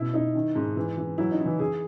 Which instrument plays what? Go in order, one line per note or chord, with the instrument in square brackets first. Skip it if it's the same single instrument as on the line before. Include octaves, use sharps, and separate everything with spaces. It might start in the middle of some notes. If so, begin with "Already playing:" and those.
Already playing: [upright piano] B2 E4
[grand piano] D#4 [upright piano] E4
[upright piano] D#3
G#2
E3
E3
[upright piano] F#3 [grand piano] E4
[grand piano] D#4
[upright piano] E4
[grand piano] E3
[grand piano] E3 [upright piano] G#4